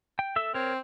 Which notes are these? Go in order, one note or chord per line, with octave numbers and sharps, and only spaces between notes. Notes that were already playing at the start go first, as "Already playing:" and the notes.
G5
A4 E5 E6
C4 A#4 C#5